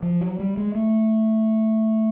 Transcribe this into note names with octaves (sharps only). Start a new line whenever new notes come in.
F3
F#3
G3
G#3
A3